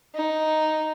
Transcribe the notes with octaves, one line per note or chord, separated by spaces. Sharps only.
D#4